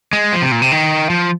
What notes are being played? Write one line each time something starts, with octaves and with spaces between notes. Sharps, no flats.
G#3
F3
C3
A#2
C3
D#3
F3